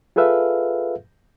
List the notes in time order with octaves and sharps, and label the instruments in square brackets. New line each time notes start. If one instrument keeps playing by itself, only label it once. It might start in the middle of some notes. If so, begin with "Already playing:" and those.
[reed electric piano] F4 G#4 A4 B4 E5 F5